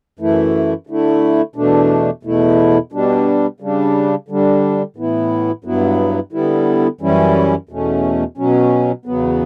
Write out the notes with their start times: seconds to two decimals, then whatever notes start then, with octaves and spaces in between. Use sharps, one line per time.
0.19 F#2 E3 A3 E4
0.87 D3 A3 E4
1.56 E2 B2 A3 D4
2.23 E2 B2 A3 E4
2.92 B2 G3 D4
3.60 C#3 G3 D4
4.28 D3 G3 D4
4.96 A2 E3 B3 E4
5.64 G2 F#3 B3 E4
6.32 D3 G3 B3 E4
7.01 F#2 E3 G3 C#4 E4
7.69 E2 B2 A3 C#4
8.37 B2 F#3 C#4
9.05 E2 C#3 F#3 B3